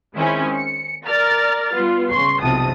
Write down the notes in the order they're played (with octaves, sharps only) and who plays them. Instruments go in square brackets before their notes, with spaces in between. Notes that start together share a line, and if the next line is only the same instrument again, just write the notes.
[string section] D#3 G#3 C4 C#4 E4
C#7
A#4 D5 F6 A6
G3 B3 F4
C#3 C6 C#6 C7
B1 F2 C3 A5 D#6